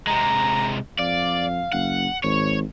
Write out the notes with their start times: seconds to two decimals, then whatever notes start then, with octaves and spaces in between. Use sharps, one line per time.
0.07 C3 G#3 A#5
0.98 F2 D5 F5
1.72 F#1 F#5
2.23 G#1 C#5